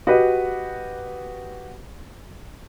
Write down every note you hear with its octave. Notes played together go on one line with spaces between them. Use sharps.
F#4 G4 B4 D#5